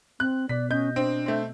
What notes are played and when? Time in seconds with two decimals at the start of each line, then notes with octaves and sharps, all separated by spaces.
0.20 C4 F#6
0.49 B2 D5 B6
0.71 C#4 D#5 G6
0.96 C4 D4
1.26 A3 C4